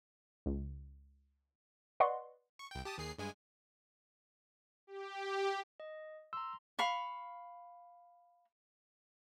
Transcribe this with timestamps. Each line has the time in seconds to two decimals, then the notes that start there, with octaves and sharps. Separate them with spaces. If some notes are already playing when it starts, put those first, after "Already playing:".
0.46 C#2
2.00 B4 D5 D#5 F#5 C6 C#6
2.59 C#6
2.71 C2 G5
2.85 G4 A5 D#6
2.98 D#2 G#4 C7
3.18 G2 G#3 G#5
4.87 G4
5.80 D#5
6.33 A#5 C6 E6
6.79 F5 B5 C#6